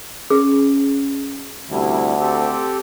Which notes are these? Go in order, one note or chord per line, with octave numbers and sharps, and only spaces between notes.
C#4 G#4
D2 C3 G3 E4
C4 G4 A4